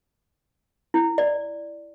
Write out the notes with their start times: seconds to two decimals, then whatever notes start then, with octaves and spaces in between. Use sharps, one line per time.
0.94 E4
1.18 D5